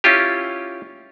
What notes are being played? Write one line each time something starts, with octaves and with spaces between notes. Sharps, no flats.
C#4 E4 F4 G4